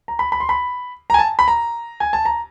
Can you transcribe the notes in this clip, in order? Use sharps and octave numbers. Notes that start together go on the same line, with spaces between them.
A#5
B5
B5
C6
B5
A#5
G#5
A5
B5
A#5
G#5
A5
A#5